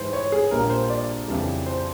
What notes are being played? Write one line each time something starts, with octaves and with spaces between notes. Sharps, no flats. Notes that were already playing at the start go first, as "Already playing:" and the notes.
Already playing: G#2 E3 G3 B4 C5
C#5
G#4
A#1 A#2 G3 A#3 A#4
C5
D5
F2 C#3 E3 G3
C5